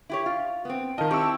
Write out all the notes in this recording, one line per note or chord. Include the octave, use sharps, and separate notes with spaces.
E4 G4 C#5
F4
B3 C4
D#3 F4 D#5 A5
C4 E4 G4 C#6 E6